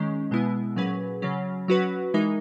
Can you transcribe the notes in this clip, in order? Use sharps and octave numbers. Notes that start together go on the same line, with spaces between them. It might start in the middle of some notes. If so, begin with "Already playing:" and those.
Already playing: D#3 G#3 C#4
B2 G#3 B3 E4
A#2 F#3 C#4 G#4 B4
C#3 F#3 C#4
F#3 C#4 F#4 B4
E3 G#3 D#4 A#4